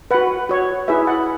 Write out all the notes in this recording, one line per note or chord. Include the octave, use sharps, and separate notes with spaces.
F#4 B4 F#5
F#4 C#5
E4 G#4 B4 E5
F#5